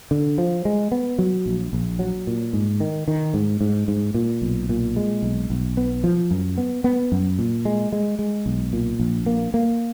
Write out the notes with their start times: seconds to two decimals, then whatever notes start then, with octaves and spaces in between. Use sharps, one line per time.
0.11 D3
0.38 F3
0.65 G#3
0.92 B3
1.19 F#3
1.46 A#1
1.73 A#1
1.99 F#3
2.27 A#2
2.53 G#2
2.80 D#3
3.08 D#3
3.34 G#2
3.61 G#2
3.88 G#2
4.14 A#2
4.42 B1
4.69 A#2
4.96 G#3
5.23 B1
5.50 B1
5.77 B3
6.04 F3
6.31 F#2
6.58 B3
6.84 B3
7.12 F#2
7.39 A#2
7.65 G#3
7.92 G#3
8.19 G#3
8.46 B1
8.73 A#2
9.00 A#1
9.26 A#3
9.54 A#3